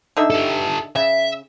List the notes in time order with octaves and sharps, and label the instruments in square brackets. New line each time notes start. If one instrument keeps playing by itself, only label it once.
[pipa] D3 D#4 E5
[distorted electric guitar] G4 A4
[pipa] C#3 [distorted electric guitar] E5